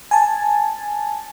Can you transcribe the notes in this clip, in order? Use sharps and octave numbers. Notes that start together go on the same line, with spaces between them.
G#5 A5